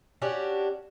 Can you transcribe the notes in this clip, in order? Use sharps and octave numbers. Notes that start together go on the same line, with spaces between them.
C#4 D4 F#4 G4